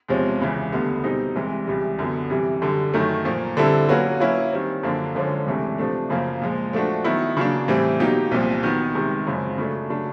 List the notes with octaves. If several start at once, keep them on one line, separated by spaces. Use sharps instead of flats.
E2 C3 F3 G#3 C#4
C#2 C#3 E3
D2 D3 G3 B3
B2 G3 C4 D#4 G#4
C2 C3 E3 G#3
C#2 C3 E3 G3
F#2 D3 F#3 B3
C3 E3 G3
F#2 D3 G3
F#2 D#3 F#3 A3
A#2 F3 A#3
D3 G3 C4 E4 A4
F#3 A#3 C#4 F#4 B4
F#3 A#3 C#4 E4
D#3 G3 C4
F#2 D3 F3 A#3 D4
F#2 D3 F3 G#3 C#4
C#2 C3 E3 A3 D4
C3 F3 A3 D4
F#2 C#3 F3 A#3
A#2 F3 G#3
F3 A3 D4 F#4
D#3 F#3 B3 E4
C#3 F#3 A#3 D4
A2 E3 G3 C4
B2 F#3 A#3 D#4 G4
C2 A#2 F3
D#3 F#3 B3
C2 C3 D#3 G#3
F#2 C#3 F3 G#3 C4
C#3 F#3 A3 D4
C#3 F#3 A3 D4